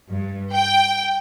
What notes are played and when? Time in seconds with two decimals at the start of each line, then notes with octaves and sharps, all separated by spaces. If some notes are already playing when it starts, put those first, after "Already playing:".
0.10 G2
0.54 G5